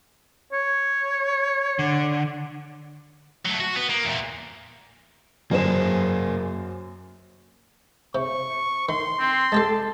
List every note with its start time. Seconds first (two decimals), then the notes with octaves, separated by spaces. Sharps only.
0.53 C#5
1.79 D3
3.45 F#3 A3
3.60 F#4
3.76 B3
3.90 A#3
4.05 E2 A#2
5.51 F#2 A#3 G#4 C5 E7
8.15 C3 C#6
8.89 D#3 C6
9.19 C4
9.52 G#3 G4 A4 A5